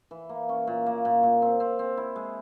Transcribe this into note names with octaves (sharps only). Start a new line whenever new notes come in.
E3
A#3
C#4
A#2
A#3
A#2
A#2
C4
C4
C4
E4
G#3